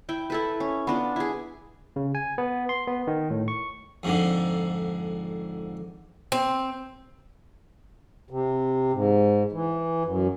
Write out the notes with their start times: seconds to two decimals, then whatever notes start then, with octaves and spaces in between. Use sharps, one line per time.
0.09 E4 G5
0.30 E4 A4 B4
0.60 C#4
0.87 B3 D4 F4
1.16 E4 G#4
1.96 C#3
2.15 G#5
2.38 B3
2.69 C6
2.88 B3
3.07 D#3
3.31 A2
3.48 C#6
4.03 F2 G#2 D3
6.32 C4
8.30 C3
8.93 G#2
9.52 E3
10.05 F#2